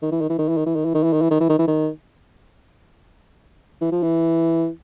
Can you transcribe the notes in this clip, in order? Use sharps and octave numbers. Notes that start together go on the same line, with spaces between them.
D#3
E3
D#3
E3
D#3
E3
D#3
E3
D#3
E3
D#3
E3
D#3
E3
D#3
E3
D#3
E3
D#3
E3
F3
E3